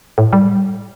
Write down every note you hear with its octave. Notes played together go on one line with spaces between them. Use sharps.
A2
G3